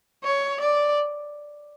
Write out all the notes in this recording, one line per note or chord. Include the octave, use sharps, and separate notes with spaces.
C#5
D5